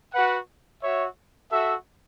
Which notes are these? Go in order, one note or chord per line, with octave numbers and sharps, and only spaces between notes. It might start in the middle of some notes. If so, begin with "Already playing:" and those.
F#4 B4 F#5
F#4 C#5 E5
F#4 A4 E5